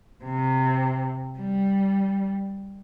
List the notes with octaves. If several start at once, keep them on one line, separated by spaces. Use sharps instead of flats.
C3
G3